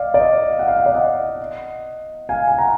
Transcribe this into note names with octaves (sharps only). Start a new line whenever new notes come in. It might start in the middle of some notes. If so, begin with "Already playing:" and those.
Already playing: D5 D#5 F5
D5
D#5
F5
F#5
F5
F#5
D5 F5
D#5 F#5
F5 G#5
G#5
F#5 A#5